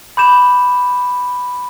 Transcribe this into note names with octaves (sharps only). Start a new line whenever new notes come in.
B5 D6 G6 E7